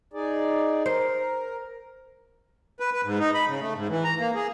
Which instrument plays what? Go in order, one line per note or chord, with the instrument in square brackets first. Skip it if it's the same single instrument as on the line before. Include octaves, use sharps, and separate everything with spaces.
[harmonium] D#4 G#4 D5
[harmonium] A#4 [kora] C5
[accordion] B4
B4
G#2
D#4
B5
C#3
A3
G#2
E3
A#5
A#3
G#4